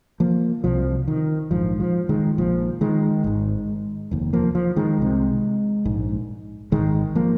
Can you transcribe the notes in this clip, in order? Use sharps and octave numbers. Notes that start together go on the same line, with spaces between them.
F3 A#3
C2 C3 F3
D#3
A#1 G#2 F3
F3
D#3 G#3
A#1 A#2 F3
D#3 G#3
G#1 G#2
F1 D#2
F3 A#3
F3
D#3 G#3
C2 C3
A#1 G#2
G#1 G#2 D#3 G#3
F3 A#3